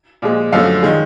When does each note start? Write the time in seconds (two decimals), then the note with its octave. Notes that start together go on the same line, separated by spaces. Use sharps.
0.22 A#2 F3 G#3
0.52 F#2 D3 F3 A3 F5
0.83 D#3 G#3